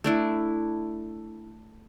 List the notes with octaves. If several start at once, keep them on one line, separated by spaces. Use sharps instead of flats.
A3 D4 E4